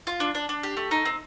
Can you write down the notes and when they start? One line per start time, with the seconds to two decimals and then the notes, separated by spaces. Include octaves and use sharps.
0.07 F4
0.20 D4
0.35 D4
0.49 D4
0.63 G4
0.77 A3
0.91 D#4
1.05 C4